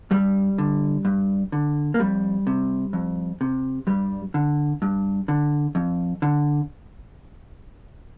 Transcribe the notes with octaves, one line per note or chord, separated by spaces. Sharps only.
G2 G3
D3
G2
D3
A#3
F2 G3
C3
F2
C3
G2 G3
D3
G2
D3
F2
D3